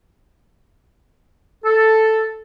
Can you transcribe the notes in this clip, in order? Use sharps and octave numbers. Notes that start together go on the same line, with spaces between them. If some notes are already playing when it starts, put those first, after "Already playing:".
A4